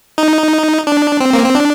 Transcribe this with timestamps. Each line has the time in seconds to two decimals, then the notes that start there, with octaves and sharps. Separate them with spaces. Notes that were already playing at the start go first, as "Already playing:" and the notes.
0.18 D#4
0.87 D4
1.20 C4
1.33 A#3
1.45 C4
1.55 D4